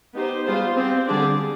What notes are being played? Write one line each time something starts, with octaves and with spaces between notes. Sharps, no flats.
B3 D#4 G4 C5
G3 B3 F4 G#4 C5
C4 G4 C5
D3 G3 D4 G#4 D5